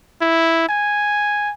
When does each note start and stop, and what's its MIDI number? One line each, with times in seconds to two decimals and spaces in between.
0.21 0.67 64
0.69 1.53 80